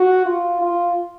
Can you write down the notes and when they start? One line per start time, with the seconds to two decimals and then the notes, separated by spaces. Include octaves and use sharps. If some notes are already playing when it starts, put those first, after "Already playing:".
Already playing: F#4
0.26 F4
0.61 F4